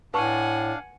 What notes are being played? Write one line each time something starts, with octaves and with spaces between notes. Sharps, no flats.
A2 D4 B4 F5 F#5 G#5 A5 C#6